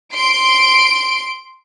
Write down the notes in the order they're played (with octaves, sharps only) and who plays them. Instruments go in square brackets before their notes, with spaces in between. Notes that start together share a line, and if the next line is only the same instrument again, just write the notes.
[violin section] C6 D7